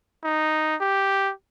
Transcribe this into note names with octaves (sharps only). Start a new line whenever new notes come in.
D#4
G4